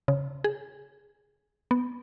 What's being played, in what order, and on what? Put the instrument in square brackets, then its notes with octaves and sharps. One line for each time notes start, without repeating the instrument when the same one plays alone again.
[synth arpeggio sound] C#3
G#4
B3